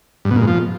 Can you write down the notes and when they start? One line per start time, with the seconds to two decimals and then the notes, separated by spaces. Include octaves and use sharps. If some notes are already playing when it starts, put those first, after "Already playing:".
0.25 G2
0.31 B2
0.36 A#2
0.42 G#2
0.47 F3